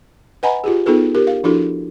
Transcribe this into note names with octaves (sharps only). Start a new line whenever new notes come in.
B4 D#5 F#5 G#5 A#5 B5
F4 G4 G#4
B3 D#4 F4 G#4 A4 B4
G4 A#4
F5
F3 D4 E4 F#4 A4